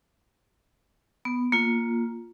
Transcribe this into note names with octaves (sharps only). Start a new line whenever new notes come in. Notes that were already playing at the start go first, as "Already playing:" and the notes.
B3
A#3 F4